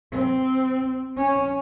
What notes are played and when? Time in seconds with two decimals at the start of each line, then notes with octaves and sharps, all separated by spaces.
0.11 C4
1.17 C#4